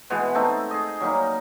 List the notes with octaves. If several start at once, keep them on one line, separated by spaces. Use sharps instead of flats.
B2 E3 G#3 B3
A3 C4 D#4 A4
G#4 D#5
F#3 G3 A#3 D#4